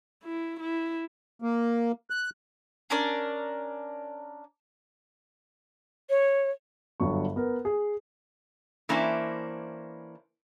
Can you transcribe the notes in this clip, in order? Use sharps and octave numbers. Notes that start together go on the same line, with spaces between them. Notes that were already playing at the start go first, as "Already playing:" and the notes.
E4
E4
A#3
F#6
C#4 D4 A#4 D5
C#5
G1 G2 F#3 C#6
B3 A#4
G#4
E3 A#3 C#4 D4 E4 C5